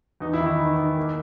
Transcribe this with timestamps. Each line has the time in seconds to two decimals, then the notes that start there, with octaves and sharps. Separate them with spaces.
0.20 E2 D#4
0.33 E4
0.40 D#3
0.46 E4
0.59 D#3
0.78 D#3
0.97 A#3